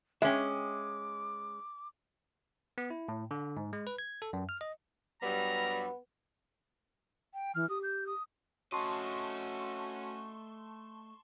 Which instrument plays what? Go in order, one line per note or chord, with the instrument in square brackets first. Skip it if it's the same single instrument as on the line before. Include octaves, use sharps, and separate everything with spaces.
[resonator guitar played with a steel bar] G#3 C#4 [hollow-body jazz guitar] E5 G5 [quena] D6
[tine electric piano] B3
E4
A2
D3
G#2
G#3
B4
G#6
A4
F#2
F6
D#5
[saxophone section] G2 F#3 G3 [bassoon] B3 [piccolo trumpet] A#5
[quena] G5
[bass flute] E3 [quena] F6
[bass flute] G4 [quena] D#6
[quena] G6
D#6
[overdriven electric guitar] A3 D#5 [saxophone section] C#4 F#4 [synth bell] A5 C6 C#6